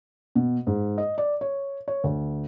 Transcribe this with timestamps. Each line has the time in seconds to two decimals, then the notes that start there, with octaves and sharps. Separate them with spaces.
0.35 B2
0.67 G#2
0.98 D#5
1.18 D5
1.41 C#5
1.88 C#5
2.04 D2